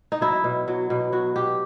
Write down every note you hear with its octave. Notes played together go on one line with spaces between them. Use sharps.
D#4
F#3 E4
B2
F#3
B2
F#3 F#4
B2 G4